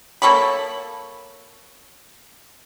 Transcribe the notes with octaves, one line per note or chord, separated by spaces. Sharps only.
A#3 A4 C#5 B5